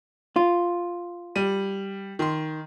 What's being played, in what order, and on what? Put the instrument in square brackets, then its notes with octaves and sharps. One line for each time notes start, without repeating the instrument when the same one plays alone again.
[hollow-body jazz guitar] F4
[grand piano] G3 D#7
D#3 C6